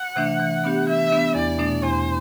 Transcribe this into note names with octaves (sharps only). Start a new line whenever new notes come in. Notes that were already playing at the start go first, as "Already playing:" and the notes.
Already playing: F#5
C3 E3 A3 D4
E3
B3 D4 G4
E3 E5
B3 D4 G4
E2 D5
B2 A3 D4
E2 C5